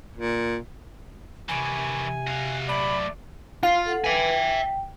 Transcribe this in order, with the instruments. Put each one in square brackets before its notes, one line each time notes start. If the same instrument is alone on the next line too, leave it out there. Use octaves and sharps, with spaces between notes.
[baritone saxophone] A#2
[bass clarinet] C3 [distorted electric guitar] D#3 E3 [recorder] G#5
[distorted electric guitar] F#4 F5
[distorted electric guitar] F#3 A3 [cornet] D5 [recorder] B5
[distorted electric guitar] F4 [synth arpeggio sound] F5
[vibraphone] A4 F#5
[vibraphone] B4 G5 [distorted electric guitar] E5 G#5
[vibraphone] G5